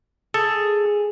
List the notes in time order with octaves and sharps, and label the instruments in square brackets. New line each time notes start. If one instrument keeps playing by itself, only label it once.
[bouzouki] G#4 [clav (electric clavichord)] A4